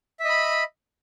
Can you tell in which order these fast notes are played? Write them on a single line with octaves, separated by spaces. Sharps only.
E5 D#5 B5